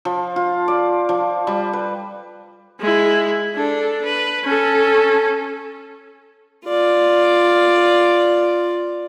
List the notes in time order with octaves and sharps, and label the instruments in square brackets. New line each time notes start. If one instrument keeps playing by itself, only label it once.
[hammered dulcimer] F3
F4
D5
F3
G3
B4
[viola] G#3 E4
D4 A4
B4
C#4 A4
[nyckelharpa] F4 D5